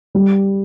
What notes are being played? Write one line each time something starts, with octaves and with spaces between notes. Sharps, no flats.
G3